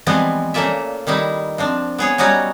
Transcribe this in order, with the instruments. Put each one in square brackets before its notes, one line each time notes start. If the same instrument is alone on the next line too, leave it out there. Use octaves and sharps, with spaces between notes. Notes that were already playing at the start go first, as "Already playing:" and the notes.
[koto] E3 F3 G3 G#3 B3 C4
A#2 C#3 A3 A#3 D5 E5
D#3 G3 D#4 E4
F3 C4 D4
B3 G#4 C#5
F#3 G3 C#4 D#4 F#4 C#5